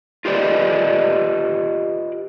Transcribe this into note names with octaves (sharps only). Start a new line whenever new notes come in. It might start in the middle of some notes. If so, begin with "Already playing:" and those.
F4 G4 B4 D5 D#5